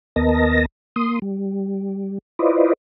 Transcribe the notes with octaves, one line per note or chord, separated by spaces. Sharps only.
D#2 B3 A#4 D#5 A5 A#6
A#3 C6 D#6
G3
E4 F4 B4 C5 D5 D#5